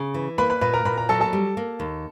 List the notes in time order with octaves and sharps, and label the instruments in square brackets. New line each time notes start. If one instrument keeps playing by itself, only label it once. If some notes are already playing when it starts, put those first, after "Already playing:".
Already playing: [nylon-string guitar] C#3
E3
[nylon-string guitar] A#3 [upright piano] B4 B5
[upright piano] B4 B5
[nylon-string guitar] A#2 [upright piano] B4 B5
[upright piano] A#4 A#5
[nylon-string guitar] A#2 [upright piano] B4 B5
[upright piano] A#4 A#5
[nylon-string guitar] F#3 [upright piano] A4 A5
[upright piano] A4 A5
[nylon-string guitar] G3
A#3
D#2